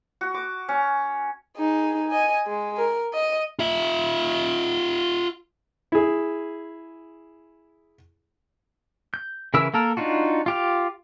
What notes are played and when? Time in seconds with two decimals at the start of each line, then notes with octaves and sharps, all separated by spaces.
0.21 F#4
0.34 D6
0.69 C#4
1.57 D#4 G#4
2.08 D#5 G#5
2.47 G#3
2.78 A#4
3.14 D#5
3.59 F4 E5
5.92 E4 G#4
9.14 G6
9.54 C#3 E3 E4 A#4 E6
9.74 A#3 A4 A#4
9.97 D4 D#4 F4 F#4
10.46 F4 G4 F5